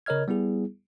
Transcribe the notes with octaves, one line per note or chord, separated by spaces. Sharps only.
C#3 A#4 C#5 D#5 F6 G#6
G3 B3 E4 G#4